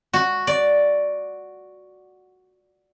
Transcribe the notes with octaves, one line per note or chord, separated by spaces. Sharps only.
F#4
D5